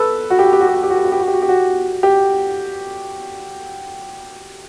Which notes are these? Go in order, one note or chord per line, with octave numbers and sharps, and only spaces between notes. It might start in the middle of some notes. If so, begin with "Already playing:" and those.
Already playing: A4 B4
F#4
G4
F#4
G4
F#4
G4
F#4
G4
F#4
G4
F#4
G4
F#4
G4
F#4
G4
F#4
G4